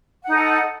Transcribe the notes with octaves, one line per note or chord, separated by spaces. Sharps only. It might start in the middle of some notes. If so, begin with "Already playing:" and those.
D#4 A4 F#5